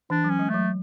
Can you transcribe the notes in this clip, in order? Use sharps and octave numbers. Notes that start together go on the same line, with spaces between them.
E3 D4
F#3 C#4
G#3
F#3 A3